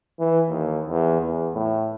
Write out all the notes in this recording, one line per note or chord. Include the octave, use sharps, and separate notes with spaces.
E3
D#2
E2
E2
A2